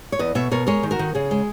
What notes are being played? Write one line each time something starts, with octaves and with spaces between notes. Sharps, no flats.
C#5
E2 B4 D#5
B2 C#5 E5
B2 A#4 C#5
G#3 A#4 C#5
D#3
F#4 A#4
D#3
C#3 G#4
G#3